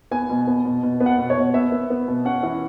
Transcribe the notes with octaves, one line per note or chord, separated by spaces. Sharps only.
B3 G#5
B2
B3
B2
B2
B3
F#5
B2
C#5
B2
B3 E5
B3
B3
B2
C#4 F#5
E3